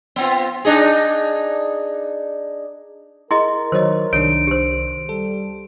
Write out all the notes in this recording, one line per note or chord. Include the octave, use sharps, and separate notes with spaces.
B3 C4 F4
D4 D#4 G#4
E4 G#4 A#4 D#5 C6
D#3 F#3 C5 C#5 D#5
C2 D#3 D4 C#5 D7
G4 C5
G3 A4